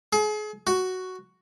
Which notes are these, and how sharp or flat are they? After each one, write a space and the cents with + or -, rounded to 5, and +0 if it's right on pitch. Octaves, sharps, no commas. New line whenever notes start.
G#4 +35
F#4 +5